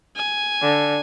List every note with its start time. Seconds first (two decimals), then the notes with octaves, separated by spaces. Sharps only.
0.17 G#5
0.62 D3